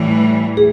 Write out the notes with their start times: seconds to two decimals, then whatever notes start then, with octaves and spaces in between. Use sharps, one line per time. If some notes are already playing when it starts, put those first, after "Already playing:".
Already playing: A2 E3 G3
0.57 G#4